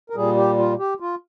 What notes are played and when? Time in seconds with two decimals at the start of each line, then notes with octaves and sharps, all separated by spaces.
0.10 A#4
0.15 A#2 G3 G#4
0.36 G4
0.58 F4
0.79 G4
1.00 F4